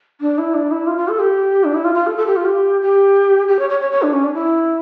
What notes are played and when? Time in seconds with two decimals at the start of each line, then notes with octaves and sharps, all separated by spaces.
0.21 D4
0.38 E4
0.54 D4
0.71 E4
0.87 F4
0.98 F4
1.09 A4
1.20 G4
1.64 D4
1.75 E4
1.84 F4
1.95 F4
2.07 A4
2.17 A4
2.27 G4
2.36 F4
2.45 G4
2.82 G4
3.48 G4
3.59 C#5
3.69 C#5
3.80 C#5
3.91 C#5
4.02 D4
4.13 C#4
4.24 D4
4.34 E4